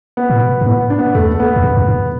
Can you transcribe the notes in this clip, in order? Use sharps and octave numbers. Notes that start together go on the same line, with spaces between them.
B3
A2
B2
F#2
A2 B3
D4
B3
E2 A3
A3
B3
E2
F#2
E2
F#2